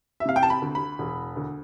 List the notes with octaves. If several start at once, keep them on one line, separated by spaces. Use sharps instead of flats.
E5
C3 F5
G5
A5
B5
D2
B5
E1
D2